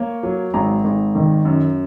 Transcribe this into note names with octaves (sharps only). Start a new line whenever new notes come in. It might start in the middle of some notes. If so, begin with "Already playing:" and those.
Already playing: A#3 C#5
F#3
G#1 A#5
G#1
D#3
F#2